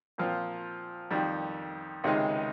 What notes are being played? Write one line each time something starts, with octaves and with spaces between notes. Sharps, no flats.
A#2 F3 C4 F4
F2 D#3 G3
C#2 C3 D#3 G#3 D#4